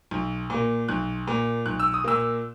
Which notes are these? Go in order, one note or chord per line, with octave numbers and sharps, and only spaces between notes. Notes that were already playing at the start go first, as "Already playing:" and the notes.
B1
A#2 A#3
B1 F#6
A#2 A#3
B1 F#6
E6
D#6
A#2 A#3 E6